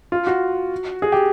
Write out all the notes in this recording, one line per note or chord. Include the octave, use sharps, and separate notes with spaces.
F4
F#4
G#4
G4